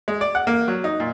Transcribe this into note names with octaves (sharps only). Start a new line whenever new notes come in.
G#3
D5
F#5
A#3
F#3
D#4
A#2